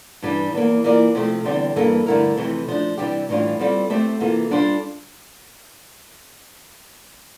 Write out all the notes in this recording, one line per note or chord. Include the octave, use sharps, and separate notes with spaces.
G2 E3 G3 D4
E2 E3 A#3
E3 A#3 F4 A#4 D5
C3 F3 A3 C4
E2 D3 G3 C4 G4
G2 E3 A#3 E4 A4
G2 D3 A3 E4 A#4
F2 C3 E3 A3 C4
F3 A3 D4
C3 E3 G3 D4 G4
A2 E3 G3 D4 F4
G3 C4 F4 A4 D5
A3 C4 G4 C5 E5
C3 E3 A#3 F4 A4
G3 D4 F4 A4 C5